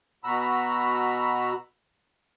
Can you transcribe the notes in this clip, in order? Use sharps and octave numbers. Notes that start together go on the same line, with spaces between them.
B2 F#4 A#5 B5 E6